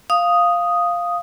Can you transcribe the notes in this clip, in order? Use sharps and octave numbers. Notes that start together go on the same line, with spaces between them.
F5 D#6